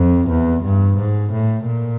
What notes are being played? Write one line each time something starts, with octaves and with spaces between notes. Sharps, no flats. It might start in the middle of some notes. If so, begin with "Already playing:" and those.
Already playing: F2
E2
G2
G#2
A2
A#2